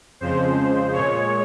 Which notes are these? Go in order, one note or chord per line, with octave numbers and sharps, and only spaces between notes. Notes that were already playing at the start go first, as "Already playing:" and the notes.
F2 C#3 F3 G#3 C5
A#2 G#3 C#5